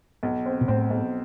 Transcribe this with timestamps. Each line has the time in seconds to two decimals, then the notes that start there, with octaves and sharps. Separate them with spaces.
0.23 B1
0.46 C4
0.61 B2
0.68 A2 C4
0.91 B1